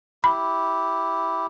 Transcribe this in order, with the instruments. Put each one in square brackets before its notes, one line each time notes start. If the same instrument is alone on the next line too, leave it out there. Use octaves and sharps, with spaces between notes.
[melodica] E4 G4 [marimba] B5